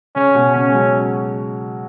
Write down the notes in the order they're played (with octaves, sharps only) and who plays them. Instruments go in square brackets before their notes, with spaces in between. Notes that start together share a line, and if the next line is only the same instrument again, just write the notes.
[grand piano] C#3 [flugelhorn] C#4
[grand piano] B2
[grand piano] C#3 [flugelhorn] C#4
[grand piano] G#3
C#3 F#3